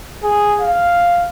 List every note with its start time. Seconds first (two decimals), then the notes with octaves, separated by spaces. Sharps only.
0.23 G#4
0.61 F5